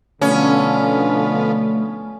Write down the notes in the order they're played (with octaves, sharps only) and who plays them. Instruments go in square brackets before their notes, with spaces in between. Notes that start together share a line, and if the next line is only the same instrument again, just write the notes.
[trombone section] B2 D3 [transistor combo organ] F3 B3 [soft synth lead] A3 [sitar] C#4